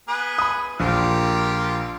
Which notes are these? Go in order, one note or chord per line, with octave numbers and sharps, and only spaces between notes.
B3 G#4 B4
B5 D#6
A#1 F4 G4 A#4